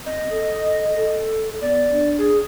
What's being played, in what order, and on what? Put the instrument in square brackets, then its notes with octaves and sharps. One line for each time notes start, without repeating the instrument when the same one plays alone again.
[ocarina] C4 [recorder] D#5
[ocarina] A4
A4
[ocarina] B3 [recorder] D5
[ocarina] D4
[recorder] G#4